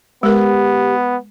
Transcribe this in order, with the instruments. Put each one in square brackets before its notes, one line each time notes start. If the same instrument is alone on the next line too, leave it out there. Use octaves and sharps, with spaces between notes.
[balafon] G#3 A#4 [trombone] B3 [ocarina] G4